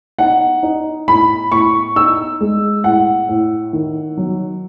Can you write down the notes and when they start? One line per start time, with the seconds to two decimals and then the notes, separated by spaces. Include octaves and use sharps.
0.19 D#4 F#5
0.63 D#4
1.08 A2 B5
1.52 A2 C#6
1.96 D#4 E6
2.41 G#3
2.84 A2 F#5
3.28 A2
3.73 D#3
4.17 F#3